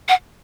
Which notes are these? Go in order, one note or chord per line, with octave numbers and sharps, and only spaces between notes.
F#5